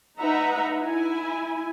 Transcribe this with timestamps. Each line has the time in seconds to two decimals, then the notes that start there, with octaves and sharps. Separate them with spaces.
0.19 D#4 B4 E5 F#5 A#5
0.82 E4 G#5